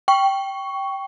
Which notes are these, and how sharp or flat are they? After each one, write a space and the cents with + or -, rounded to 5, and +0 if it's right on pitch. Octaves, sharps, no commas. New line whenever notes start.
G5 -5 C#6 +5